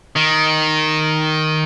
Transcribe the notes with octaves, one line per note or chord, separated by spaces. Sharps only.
D#3